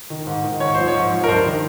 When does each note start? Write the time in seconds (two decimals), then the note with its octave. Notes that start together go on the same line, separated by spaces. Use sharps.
0.10 D#3
0.27 G#2
0.44 D#3
0.60 G#2 C#5
0.74 F3 C5
0.88 C#5
0.95 G#2
1.12 F3
1.24 A#4
1.28 G2 C5
1.45 D#3